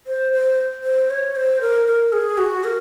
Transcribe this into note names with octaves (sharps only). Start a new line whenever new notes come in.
C5
C5
C5
C#5
C5
A#4
A#4
G#4
F#4
A#4